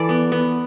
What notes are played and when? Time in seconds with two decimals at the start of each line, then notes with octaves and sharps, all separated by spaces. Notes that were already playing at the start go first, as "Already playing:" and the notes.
Already playing: E3 A4 D5
0.09 B3
0.32 B3